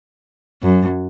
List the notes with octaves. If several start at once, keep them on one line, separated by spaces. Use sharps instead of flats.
F#2